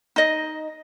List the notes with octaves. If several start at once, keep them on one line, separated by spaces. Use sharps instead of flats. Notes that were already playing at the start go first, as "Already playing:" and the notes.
D#4 D#5